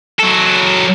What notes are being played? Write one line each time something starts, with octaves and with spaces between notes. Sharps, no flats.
F#3 A4